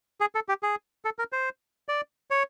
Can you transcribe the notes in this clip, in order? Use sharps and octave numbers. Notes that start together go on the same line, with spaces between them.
G#4
A4
G4
G#4
A4
A#4
C5
D5
C#5